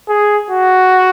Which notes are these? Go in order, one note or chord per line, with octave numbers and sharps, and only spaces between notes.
G#4
F#4